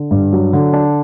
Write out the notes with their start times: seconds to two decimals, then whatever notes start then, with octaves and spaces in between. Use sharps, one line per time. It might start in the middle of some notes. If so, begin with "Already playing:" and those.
Already playing: D3
0.11 G2
0.33 F#3
0.53 D3
0.73 D4